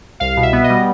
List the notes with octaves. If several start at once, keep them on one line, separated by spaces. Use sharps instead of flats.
C2 F5
B2
E5
B3
D#5
G3